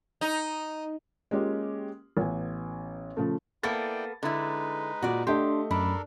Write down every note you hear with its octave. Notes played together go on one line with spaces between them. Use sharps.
D#4
G#3 A#3 C#4 F4 G4
A1 B3 G#5
C#3 F3 A3
A#3 B3 E4 A4 D5 G5 A6
D3 G#3 D#4 E4 B4
A#2 F#4 D5
A3 D4 G4 D#5 C6
F#2 D4 A4 A#4 B5